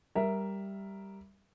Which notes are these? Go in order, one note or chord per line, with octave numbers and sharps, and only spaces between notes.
G3 A#4 E5